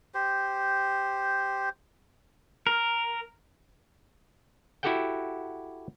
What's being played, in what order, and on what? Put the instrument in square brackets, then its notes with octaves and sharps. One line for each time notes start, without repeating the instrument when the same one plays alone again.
[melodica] G4 C5
[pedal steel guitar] A#4
[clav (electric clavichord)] E4 F#4 G4 A4 F#5 G5